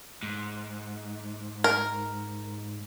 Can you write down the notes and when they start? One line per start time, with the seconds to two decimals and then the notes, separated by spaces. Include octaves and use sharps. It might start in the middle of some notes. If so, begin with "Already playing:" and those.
0.23 G#2
1.64 A#4